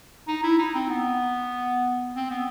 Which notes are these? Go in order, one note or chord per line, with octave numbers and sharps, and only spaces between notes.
D#4
E4
D#4
C4
B3
C4
B3